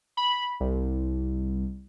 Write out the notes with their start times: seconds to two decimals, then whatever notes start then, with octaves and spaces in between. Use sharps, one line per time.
0.17 B5
0.60 C2